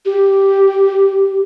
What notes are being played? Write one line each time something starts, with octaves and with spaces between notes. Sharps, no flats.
G4